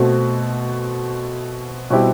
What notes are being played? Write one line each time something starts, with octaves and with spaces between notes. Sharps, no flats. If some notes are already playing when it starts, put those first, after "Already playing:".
Already playing: B2 A3 C4 F#4
B2 G3 C4 E4 G4